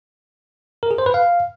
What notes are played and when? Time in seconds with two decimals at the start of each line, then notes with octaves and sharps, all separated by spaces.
0.83 A#4
0.91 G#4
0.98 C5
1.06 B4
1.14 F5